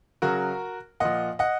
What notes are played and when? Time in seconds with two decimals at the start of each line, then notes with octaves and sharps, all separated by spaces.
0.22 C#3 F#3 F#4 A#4
1.00 A#2 F3 D#5 F#5
1.39 D#5 F#5